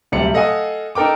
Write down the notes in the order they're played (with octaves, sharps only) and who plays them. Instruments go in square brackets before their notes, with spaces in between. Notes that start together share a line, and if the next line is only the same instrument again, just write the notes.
[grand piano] D1 C3 G3 C#7
A4 D#5 F5 F#5 G#5 D#6
D#4 A4 A#4 G5 D6